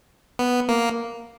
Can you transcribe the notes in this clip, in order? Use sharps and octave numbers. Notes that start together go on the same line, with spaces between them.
B3
A#3